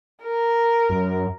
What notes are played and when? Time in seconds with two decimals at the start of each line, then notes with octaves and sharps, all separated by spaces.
0.22 A#4
0.89 F#2